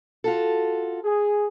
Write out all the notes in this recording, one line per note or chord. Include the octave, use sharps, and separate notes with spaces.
F4 F#4 A4
G#4